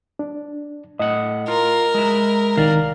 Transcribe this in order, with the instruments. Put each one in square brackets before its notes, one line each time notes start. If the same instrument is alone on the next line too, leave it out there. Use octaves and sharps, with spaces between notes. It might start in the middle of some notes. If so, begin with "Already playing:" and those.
[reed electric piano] D4
[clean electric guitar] A2 F#5 [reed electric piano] D#5
[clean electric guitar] F4 [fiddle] A#4
[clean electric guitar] G#3 E4
[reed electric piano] C2 D#3 [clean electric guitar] D5 F5